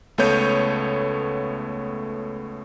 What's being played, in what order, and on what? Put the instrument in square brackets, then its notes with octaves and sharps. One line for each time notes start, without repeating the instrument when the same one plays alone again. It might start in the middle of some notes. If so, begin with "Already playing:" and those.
[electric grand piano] C#2 A3 B3 C#5 G6 D#7